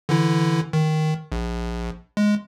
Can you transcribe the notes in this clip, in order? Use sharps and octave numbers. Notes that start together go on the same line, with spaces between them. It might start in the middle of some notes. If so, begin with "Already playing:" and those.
D3 E3 E4
D#3
A#1
G#3